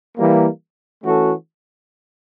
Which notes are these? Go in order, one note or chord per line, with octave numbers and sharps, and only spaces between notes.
E3 G3 A#3
E3 A3 C#4 F#4 A4